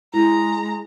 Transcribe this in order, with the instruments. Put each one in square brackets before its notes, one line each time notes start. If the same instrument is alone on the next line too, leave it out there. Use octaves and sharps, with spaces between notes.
[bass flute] G#3 [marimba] E4 [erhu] A#5